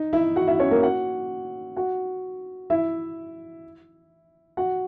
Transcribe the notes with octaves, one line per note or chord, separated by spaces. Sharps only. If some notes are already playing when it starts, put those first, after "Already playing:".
Already playing: D#4 D#5
E4 E5
F#4 F#5
E4 E5
C#4 C#5
A#3 A#4
F#4 F#5
F#4 F#5
E4 E5
F#4 F#5